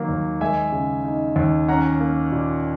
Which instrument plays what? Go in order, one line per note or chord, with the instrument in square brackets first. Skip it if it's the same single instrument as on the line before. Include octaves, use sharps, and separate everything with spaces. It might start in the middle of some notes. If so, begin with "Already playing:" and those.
Already playing: [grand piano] D#3 F#3 A#3
D#2
G#3 E5 G#5
C#3
D#4
D#2
C#4 F#5 A#5
A#3
A#2